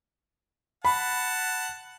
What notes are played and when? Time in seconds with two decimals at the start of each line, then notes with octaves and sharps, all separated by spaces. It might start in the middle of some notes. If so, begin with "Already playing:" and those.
0.85 F#5 A5 B5